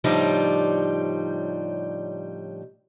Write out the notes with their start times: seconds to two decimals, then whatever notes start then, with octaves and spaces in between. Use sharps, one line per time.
0.04 A2 C#3 F3 G3 D4 D#4